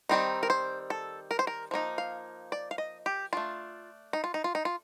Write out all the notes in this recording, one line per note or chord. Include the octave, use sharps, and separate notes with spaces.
D#3 G3 C4 D#4
A#4
C5
A4
A#4
C5
A#4
F3 A#3 D#4
F5
D5
F5
D#5
G4
A3 D4 F4
D#4
F4
D#4
F4
D#4
F4